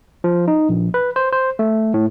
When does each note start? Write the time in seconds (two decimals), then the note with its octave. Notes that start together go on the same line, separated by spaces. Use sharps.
0.24 F3
0.48 D#4
0.69 A#1
0.94 B4
1.16 C5
1.32 C5
1.59 A3
1.94 A2